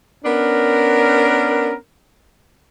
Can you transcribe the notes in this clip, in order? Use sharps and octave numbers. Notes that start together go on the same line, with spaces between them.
B3 C#4 D4 A#4